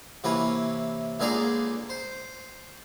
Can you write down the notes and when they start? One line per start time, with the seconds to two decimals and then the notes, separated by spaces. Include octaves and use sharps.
0.24 C3 E3 A#3 C#4 B4
1.20 C#2 D3 A#3 G#4 D5 A#5
1.90 C5